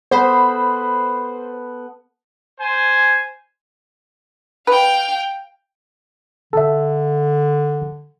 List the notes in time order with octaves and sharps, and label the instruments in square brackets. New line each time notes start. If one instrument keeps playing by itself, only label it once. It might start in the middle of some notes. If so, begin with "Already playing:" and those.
[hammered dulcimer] B3 A4 B5 [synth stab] C5
[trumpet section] C5 G#5
[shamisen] B4 [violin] F5 G5
[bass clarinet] D3 [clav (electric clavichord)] A4 E5